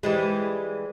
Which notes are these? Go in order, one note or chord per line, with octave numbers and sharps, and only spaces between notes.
E3 G3 G#3